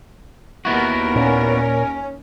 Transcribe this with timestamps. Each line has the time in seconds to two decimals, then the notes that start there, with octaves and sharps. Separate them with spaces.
0.65 D#2 B3 E4 F#4 A#4
1.16 A#2 C#4